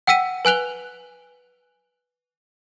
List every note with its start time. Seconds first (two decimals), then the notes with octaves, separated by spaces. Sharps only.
0.07 F#5 G5 E6 B6 D#7
0.45 B4 G#5 F#6 F7 G7